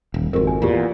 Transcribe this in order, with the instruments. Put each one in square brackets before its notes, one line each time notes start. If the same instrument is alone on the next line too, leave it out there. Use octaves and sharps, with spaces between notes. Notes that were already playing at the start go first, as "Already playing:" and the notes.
[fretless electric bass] D#1
[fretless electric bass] G#1 F2 [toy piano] F#4 G4 A#4
[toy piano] G#5
[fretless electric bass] E2 A#2 [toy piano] F4 G4